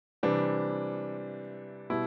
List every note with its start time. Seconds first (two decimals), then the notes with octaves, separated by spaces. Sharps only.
0.23 C3 E3 G3 D4
1.90 B2 G3 E4